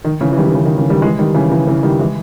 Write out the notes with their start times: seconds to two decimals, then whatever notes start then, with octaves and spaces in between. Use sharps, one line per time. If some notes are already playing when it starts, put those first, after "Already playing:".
0.04 D#3
0.21 C#3 E3
0.32 E3
0.37 D#3 G3
0.48 D#3
0.54 C#3 E3
0.65 D#3
0.78 C#3 E3
0.90 D#3 G3
1.02 E3 G#3
1.19 D#3 G3
1.34 C#3 E3
1.51 C#3 E3
1.68 C#3 E3
1.83 D#3 G3
1.99 E3 G#3